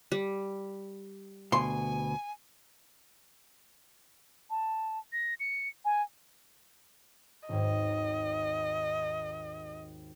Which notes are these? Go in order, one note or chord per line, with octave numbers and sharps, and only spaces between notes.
G3
D2 B2 G#5 C6
A5
A#6
C#7
G#5
G#1 D#2 G#2 D#5